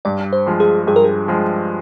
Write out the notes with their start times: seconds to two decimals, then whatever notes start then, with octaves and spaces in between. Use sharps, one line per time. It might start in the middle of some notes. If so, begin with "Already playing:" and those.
0.05 G2 D5
0.33 C5
0.46 F3 G#3
0.60 G#4
0.87 G2 G#4
0.96 A#4
1.04 G#4
1.28 F3 G#3